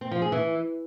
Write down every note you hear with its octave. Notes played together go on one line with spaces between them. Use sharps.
C4
F3
G#4
E3